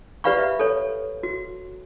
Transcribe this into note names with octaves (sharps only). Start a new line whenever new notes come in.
G4 B4 D5 F5 B5 C#6
E5
A4 C#5
F#4